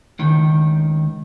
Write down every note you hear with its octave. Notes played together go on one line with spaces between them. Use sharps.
C#2 D#3